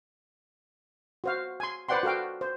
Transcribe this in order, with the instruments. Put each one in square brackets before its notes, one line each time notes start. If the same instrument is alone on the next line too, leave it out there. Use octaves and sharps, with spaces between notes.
[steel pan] F#4 C5 F5
G#5 C6
B4 C5 D5 F#5 G5 C6
F#4 A4 F5 G5
C5